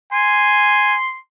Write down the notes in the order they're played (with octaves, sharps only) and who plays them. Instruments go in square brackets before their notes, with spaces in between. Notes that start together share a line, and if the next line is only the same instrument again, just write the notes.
[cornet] G#5 [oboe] C6